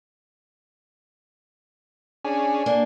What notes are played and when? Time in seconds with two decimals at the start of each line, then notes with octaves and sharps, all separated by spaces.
2.25 C#4 D4 G#4 G#5
2.66 A#3 D4